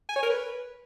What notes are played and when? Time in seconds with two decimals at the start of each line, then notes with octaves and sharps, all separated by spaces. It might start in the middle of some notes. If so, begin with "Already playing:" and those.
0.09 G#5
0.16 C#5
0.23 A#4
0.30 B4